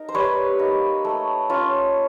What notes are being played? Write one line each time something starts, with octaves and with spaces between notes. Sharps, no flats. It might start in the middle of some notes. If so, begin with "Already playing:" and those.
Already playing: D#4 A#4
C5
G3 B4 C#5
A#3 D#4
A3
C#4 F4